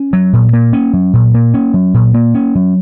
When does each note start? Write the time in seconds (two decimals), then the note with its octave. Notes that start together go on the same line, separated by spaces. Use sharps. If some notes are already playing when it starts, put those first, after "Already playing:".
Already playing: C#4
0.13 F#3
0.33 A#2
0.53 A#3
0.73 C#4
0.93 F#3
1.13 A#2
1.34 A#3
1.54 C#4
1.74 F#3
1.94 A#2
2.14 A#3
2.35 C#4
2.55 F#3